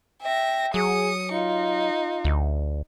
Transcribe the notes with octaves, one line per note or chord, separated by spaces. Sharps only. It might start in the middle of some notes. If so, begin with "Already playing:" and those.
E5 G5 A#6
F#3 G#4 D#6 C#7
D#4 F4
D2